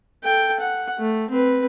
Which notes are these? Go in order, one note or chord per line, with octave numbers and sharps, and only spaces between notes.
A4 G5
F#5
A3
C4 B4